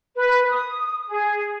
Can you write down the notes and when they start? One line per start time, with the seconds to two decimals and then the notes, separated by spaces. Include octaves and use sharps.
0.16 B4
0.49 D#6
1.08 G#4